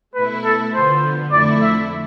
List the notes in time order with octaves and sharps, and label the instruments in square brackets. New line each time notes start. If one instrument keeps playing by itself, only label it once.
[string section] B2 A3 E4 [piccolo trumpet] B4
[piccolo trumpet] A4
[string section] D3 F3 B3 [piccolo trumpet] C5
[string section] F2 D3 A3 E4 [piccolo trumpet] D5
[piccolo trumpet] E5